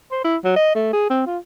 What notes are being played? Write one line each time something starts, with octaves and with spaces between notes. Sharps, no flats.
C5
E4
F#3
D#5
A3
G#4
C4
F4